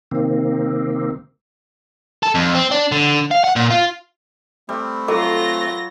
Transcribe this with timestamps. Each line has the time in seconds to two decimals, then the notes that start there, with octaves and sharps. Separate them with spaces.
0.11 C3 D#3 A#3 C4
2.23 A4
2.35 F2
2.55 C4
2.71 D4
2.92 D3
3.31 F5
3.44 F#5
3.56 A#2
3.71 F4
4.69 G3 A3 C4
5.08 F#3 F4 A4 D#5 D6 A#6